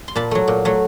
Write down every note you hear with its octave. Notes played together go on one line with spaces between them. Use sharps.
C6
A#2 A5 B5
F#3 A3
A#2
F#3 A3